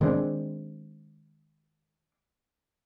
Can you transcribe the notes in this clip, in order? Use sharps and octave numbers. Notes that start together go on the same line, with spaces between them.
D#3 G#3 C4 D4